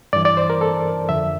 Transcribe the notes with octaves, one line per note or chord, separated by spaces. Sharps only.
G2 E3 D5
D5
C5
A#4
A4
F2 D3 F3 E5